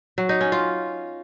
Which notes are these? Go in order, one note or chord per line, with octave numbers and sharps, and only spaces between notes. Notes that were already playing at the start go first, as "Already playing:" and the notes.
F#3
D#4
C#4
F4